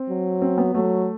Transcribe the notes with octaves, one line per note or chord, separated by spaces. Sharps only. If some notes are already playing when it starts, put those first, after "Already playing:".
Already playing: C4
F#3
C4
B3
F#3 A3